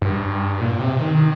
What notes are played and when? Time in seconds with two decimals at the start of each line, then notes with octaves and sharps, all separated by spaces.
0.02 G2
0.61 A#2
0.79 C3
0.99 D#3